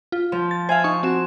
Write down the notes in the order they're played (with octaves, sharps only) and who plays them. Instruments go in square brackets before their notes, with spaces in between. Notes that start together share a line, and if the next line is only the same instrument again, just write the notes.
[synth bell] F4
[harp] F3
[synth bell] A6
[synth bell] C5 E5 F5 [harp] G#5
[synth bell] D#4 C#6
C4 F#4 E7